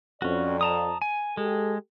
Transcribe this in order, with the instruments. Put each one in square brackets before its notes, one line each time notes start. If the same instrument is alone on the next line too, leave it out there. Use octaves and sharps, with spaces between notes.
[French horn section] F2 D5 [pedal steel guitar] C#4 F#4
[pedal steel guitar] A5 A#5 D#6
G#5
[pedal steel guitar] G#3 [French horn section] G4 A4